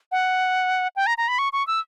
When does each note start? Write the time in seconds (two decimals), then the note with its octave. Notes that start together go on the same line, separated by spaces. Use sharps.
0.12 F#5
0.96 G5
1.07 A#5
1.18 A#5
1.28 B5
1.39 C#6
1.53 C#6
1.67 E6